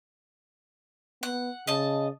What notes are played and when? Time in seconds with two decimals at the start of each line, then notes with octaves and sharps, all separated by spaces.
1.23 B3 F#5
1.67 C#3 D#5 A5